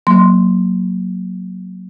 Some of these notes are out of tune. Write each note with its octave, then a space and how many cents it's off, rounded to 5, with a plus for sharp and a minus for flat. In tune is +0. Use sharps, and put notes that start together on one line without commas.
F#3 +0 A#3 +0 C6 +0